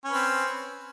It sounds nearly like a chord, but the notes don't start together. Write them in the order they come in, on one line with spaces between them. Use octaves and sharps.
C#4 B4 C4